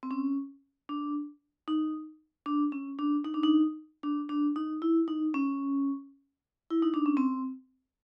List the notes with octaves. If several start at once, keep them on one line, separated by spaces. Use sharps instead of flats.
C4
C#4
D4
D#4
D4
C#4
D4
D#4
D4
D#4
D4
D4
D#4
E4
D#4
C#4
E4
D#4
D4
C#4
C4